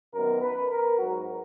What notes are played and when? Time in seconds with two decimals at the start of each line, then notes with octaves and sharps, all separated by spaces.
0.13 F#2 D#3 F#3 B3 A#4
0.41 B4
0.70 A#4
0.98 G#2 F#3 B3 F#4